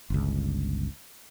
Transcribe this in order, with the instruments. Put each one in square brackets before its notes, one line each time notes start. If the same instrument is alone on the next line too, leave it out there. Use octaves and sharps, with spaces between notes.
[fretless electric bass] G1 C#2